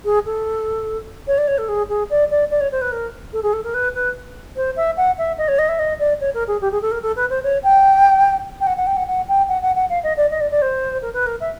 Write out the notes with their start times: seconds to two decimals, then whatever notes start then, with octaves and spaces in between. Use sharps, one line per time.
0.04 G#4
0.25 A4
1.27 C#5
1.37 D5
1.47 C#5
1.58 A4
1.68 G#4
1.89 G#4
2.10 D5
2.30 D5
2.50 D5
2.60 C#5
2.71 C5
2.81 B4
2.91 A#4
3.33 A4
3.42 G#4
3.53 A4
3.63 A#4
3.74 B4
3.94 B4
4.56 C5
4.76 E5
4.97 F#5
5.18 E5
5.38 D#5
5.48 C#5
5.58 D#5
5.68 E5
5.79 D#5
5.99 D5
6.20 C#5
6.34 A#4
6.47 G#4
6.61 G4
6.71 G#4
6.81 A4
6.91 A#4
7.02 A4
7.16 B4
7.29 C5
7.43 C#5
7.63 G5
8.60 G5
8.66 F#5
8.76 F#5
8.86 G5
8.96 F#5
9.07 F#5
9.28 G5
9.48 F#5
9.62 F#5
9.75 F#5
9.89 F5
10.03 D#5
10.17 D5
10.30 D#5
10.40 D5
10.51 D5
10.61 C5
11.02 A#4
11.13 B4
11.26 A#4
11.40 E5